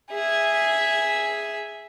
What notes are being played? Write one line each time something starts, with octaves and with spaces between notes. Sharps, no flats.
G#4 E5